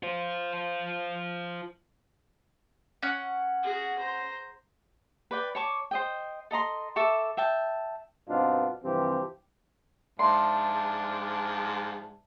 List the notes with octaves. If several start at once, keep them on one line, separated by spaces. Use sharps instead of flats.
F4 C5
C#4 F#5
F#4 G#4
C5 A#5
B4 D5 G5
C#5 A5 C#6 D6
C5 D#5 G5
A4 D#5 A#5 C6
A4 E5 C#6 D6
E5 G5 A5
G2 B2 C4 D4 D#4 F4
G2 C3 E3 F3 C4 G4
G#2 F3 D4 D5 E5 A5 C6